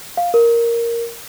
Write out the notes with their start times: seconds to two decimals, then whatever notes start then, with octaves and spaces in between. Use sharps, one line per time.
0.17 F5
0.34 A#4